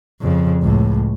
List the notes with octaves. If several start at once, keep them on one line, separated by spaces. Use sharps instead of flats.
F2 C#3
C#2 A2